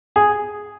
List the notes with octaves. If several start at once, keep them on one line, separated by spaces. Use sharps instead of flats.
G#4